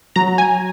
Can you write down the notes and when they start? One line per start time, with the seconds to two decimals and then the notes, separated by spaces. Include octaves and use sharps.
0.16 F#3 A#5
0.38 G#5